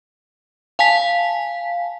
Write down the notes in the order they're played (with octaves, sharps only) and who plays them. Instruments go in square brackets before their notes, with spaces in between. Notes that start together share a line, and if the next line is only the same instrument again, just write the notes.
[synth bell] F5 G#5 A5 B6